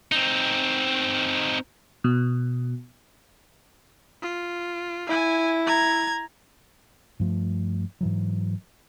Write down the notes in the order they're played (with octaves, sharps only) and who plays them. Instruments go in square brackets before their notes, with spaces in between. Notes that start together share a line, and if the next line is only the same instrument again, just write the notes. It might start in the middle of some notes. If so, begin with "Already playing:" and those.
[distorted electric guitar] C4 D#4
[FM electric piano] B2
[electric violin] F4
[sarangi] E4 [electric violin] G#5
[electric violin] A#5 G#6
[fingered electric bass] G2 F3 A3
G#2 E3 F#3